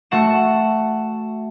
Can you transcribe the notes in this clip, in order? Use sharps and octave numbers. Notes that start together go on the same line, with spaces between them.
A3 F#4 F#5 E7